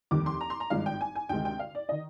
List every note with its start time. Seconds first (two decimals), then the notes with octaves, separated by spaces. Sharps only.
0.11 F1 D#2 D#3 G3 D6
0.26 C6
0.41 A#5
0.50 C6
0.60 A#5
0.70 G#1 G2 F3 G#3 F5
0.86 G5
1.01 G#5
1.15 G#5
1.29 D2 C3 D#3 G#3 G5
1.45 G5
1.59 F5
1.75 D5
1.89 D#3 D#5